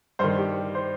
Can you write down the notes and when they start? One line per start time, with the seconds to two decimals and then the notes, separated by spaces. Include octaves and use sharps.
0.19 G2 D#3 C5
0.38 G4
0.75 C5